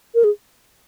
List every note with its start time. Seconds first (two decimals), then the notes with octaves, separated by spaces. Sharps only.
0.15 A#4
0.24 G#4